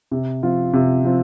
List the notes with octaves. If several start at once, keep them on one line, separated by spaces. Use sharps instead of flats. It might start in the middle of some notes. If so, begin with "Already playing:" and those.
C3
F3 C4 F4
C3
F3 C4 F4